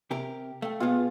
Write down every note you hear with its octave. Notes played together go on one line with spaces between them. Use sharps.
C3 G4 A#4
A3 F5 G5
B2 B3 F4 G#4 F5